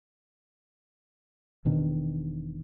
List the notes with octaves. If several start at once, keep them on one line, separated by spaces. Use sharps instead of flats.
E1 B2 D#3 D4